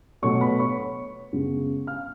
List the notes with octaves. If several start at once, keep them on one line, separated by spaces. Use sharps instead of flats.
B2 F#3 A3 C#5 C#6
B4 B5
C#5 C#6
F#2 C#3 G#3 B3
F5 F6